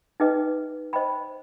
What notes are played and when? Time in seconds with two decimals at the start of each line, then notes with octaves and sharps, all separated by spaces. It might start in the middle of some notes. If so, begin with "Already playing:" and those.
0.20 D#4 G#4 B4 D#5 G5
0.93 C5 D#5 G5 B5